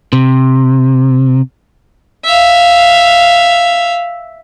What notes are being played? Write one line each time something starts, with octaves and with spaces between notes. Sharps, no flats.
C3
E5 F5